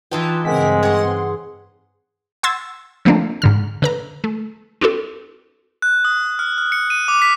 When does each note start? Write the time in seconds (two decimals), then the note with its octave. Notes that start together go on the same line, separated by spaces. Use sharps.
0.11 E3 D#4 F4 G4 B4 A5
0.45 G2 C#3 G#3 C4 A#4 F#5 B6
0.83 G#4 C#5 F#5 C6
2.43 F#5 C6 E6 G#6 A6
3.05 D3 F3 A3 A#3 C4 D4
3.42 G#2 D3 F6
3.82 D3 B4 A#5
4.24 A3
4.81 C4 D4 E4 F#4 A4
5.82 F#6
6.05 D#6
6.39 F6
6.58 F6
6.72 C#7
6.90 D#7
7.08 D6
7.22 B6